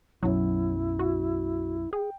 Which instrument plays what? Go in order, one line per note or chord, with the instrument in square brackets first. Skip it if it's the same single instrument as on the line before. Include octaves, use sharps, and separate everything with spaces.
[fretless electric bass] B1 F#2 [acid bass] F#3 [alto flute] E4
[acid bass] F#4
[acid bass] G#4 [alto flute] G5